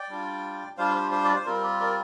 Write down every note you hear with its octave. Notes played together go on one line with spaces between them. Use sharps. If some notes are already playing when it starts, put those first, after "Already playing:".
Already playing: D5 G5
G3 D4 F4
G3 D4 F4 C5 F5
G4 C5
G4 C5
D5
C5
G3 C4 F4 A#4
G4
A#4 D5